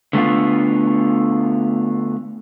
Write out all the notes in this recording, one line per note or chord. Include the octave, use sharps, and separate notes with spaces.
D3 A3 B3 F4